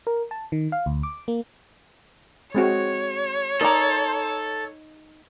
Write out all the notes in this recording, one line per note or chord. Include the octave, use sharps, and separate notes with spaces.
A#4
A5
D#3
F5
D2
D6
A#3
G#3 C4 F#4 C#5
D#4 A4 A#4 D5 A#5